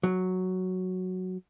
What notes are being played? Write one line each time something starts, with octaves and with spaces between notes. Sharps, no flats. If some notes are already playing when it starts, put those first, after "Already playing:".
F#3